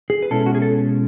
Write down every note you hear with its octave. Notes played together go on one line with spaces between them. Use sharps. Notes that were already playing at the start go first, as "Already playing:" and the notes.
G#4
B4
B2 G#3 C#4 E4 A4
F#4
G#4
A4